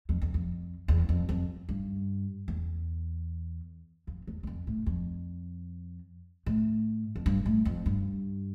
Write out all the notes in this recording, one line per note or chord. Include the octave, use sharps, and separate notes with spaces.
F2
E2
F2
E2
F2
F2
G2
E2
F2
E2
E2
F2
A2
F2
A2
F2
G2
A2
F2
G2